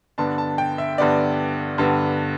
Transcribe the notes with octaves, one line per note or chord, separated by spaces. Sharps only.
G2 D3 B3 D4 A5
A5
G5
E5
G2 D3 B3 D4 D5
G2 D3 B3 D4